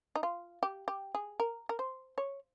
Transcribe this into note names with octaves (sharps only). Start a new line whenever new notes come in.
D#4
F4
G4
G4
G#4
A#4
A#4
C5
C#5